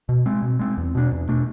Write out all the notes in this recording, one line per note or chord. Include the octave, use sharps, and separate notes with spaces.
B2
G#3 C4
B2
G#3 C4
E2
B2 A3 D4
E2
B2 A3 D4